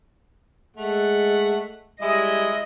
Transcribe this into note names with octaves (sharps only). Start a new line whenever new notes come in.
G#3 A3 F#5
G3 G#3 E4 D#5 D#6